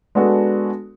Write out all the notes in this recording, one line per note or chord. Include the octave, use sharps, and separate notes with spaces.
G#3 B3 D4 F#4 A4